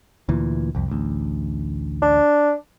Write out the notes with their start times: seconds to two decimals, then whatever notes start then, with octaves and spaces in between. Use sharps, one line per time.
0.29 D2 A#2 E3
0.75 C2 F2
0.88 A1 D2
2.02 D4